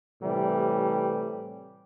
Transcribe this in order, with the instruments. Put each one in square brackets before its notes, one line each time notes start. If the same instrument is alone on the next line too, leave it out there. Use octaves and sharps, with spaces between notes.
[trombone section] A2 C3 E3 G3